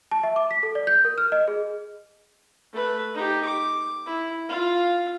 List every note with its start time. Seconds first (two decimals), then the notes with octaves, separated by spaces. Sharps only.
0.11 A5
0.23 E5
0.36 D6
0.51 B6
0.63 A4
0.75 D5
0.87 G6
1.05 A#4
1.18 F6
1.32 D#5
1.48 G#4
2.73 A3 B4
3.14 D#4 G4
3.45 D6
4.06 E4
4.49 F4 F5